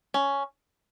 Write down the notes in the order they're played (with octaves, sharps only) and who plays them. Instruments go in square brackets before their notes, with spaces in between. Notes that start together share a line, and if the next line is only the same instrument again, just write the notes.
[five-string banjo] C#4